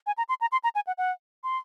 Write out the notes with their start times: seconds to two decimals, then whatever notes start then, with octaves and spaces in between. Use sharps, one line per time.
0.07 G#5
0.18 A#5
0.29 C6
0.41 A#5
0.52 C6
0.64 A#5
0.75 G#5
0.87 F#5
0.98 F#5
1.44 C6